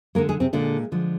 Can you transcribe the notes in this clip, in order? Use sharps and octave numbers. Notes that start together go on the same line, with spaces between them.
D3 G#3 A#3 A#4
G#3 G#4
C3 C4
A#2 D3 G#3 D4
D3 F3 G#3